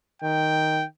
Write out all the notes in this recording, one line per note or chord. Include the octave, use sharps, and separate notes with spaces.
D#3 G5